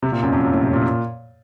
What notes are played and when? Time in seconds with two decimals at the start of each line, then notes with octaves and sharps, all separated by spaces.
0.02 C3
0.12 A#2
0.22 F#2
0.32 F2
0.43 F#2
0.53 A2
0.63 C3
0.73 A#2